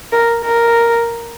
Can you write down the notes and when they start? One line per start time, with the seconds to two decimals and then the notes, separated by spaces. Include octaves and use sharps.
0.12 A#4
0.44 A#4